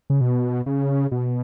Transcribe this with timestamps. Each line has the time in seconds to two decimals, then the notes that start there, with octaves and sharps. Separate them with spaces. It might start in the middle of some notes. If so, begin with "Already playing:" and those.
0.10 C#3
0.21 B2
0.66 C#3
1.12 B2